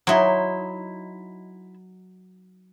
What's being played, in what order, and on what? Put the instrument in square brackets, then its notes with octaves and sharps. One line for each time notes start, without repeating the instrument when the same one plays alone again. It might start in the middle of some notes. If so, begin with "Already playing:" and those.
[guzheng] F#3 D#4 [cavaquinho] E4 C6